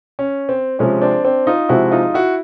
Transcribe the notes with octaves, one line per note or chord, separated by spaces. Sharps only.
C#4
C4
C3 F3 G#3 C4 C#4
C4 D4
C4 D4
D#4 F4
C3 F3 G#3 C4 E4 F#4
D#4 F4
E4 F#4